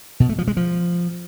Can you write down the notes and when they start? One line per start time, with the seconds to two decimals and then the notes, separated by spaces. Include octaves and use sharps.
0.20 B2
0.29 A3
0.38 F3
0.48 G#3
0.57 F3